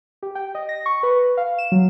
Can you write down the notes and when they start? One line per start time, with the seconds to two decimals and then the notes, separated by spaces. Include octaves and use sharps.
0.23 G4
0.35 G5
0.55 D#5
0.69 A#6
0.86 C#6
1.03 B4
1.37 F5
1.58 E7
1.72 F#3